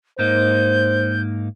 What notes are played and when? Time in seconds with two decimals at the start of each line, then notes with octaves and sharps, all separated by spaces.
0.19 G#2 A#3 D#4 C5 G6